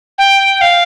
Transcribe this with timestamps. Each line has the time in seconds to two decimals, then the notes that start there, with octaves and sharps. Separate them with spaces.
0.18 G5
0.61 F5